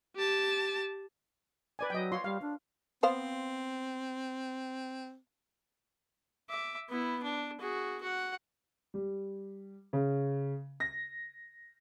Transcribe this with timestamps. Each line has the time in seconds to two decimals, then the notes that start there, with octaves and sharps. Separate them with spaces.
0.16 G4 A5
1.79 B4 D5 G#5
1.90 F#3 D#5 G5
2.12 F4 C#5 C6
2.24 G3 F5
2.42 D4
3.03 B3 C4 C5 F5
6.50 E5 D6
6.89 B3 E4
7.23 D4
7.60 F#4 G#4
8.01 F#4 F#5
8.94 G3
9.93 C#3
10.80 A#6